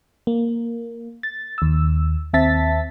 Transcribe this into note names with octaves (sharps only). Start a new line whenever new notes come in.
A#3
A6
D#2 E6
D#2 C4 E5 A5 A6 B6